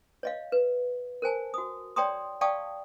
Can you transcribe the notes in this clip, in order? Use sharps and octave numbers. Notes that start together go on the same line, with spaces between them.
C#5 D#5 F5
B4
A#4 C5 G#5 A5
F#4 D#6
C#5 D5 G5 A#5 C6 D#6
D5 F5 G5 A5 C#6 D#6